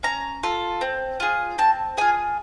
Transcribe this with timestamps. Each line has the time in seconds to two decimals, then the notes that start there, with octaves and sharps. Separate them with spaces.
0.03 C#4 A#5
0.43 F4 A4
0.81 C4
1.20 F4 G#4
1.58 C4 A5
1.97 F4 G#4 G#5